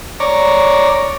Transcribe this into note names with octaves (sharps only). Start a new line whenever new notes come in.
C#5 D5 A#5